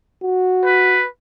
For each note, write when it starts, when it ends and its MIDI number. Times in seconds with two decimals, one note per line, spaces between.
0.23 1.03 66
0.65 1.07 71